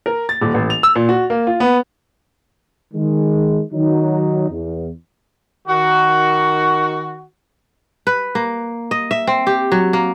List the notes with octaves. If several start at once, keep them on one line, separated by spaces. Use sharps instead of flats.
A#4
A6
D#1
A1
F7
E6
A#2
F#4
A#3
F4
B3
D#3 G#3
D#3 F#3 D#4
E2
D#3 F#4
B4
A#3
D#5
E5
C4
G4
F#3
A#3